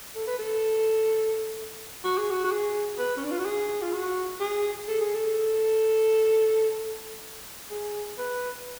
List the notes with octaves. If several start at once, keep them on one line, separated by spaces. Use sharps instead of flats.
A4
B4
A4
F#4
G#4
F#4
F#4
G#4
B4
C#4
D4
F4
F#4
G#4
F4
F#4
G#4
A4
G#4
A4
G#4
B4